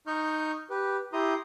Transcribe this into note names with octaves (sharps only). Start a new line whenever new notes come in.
D#4 D#5 C#6 F6 G6
G4 B4
E4 G4 A#5 C6 D#6